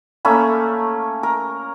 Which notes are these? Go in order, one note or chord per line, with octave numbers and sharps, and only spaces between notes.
A3 A#3 C#4 B5
A#4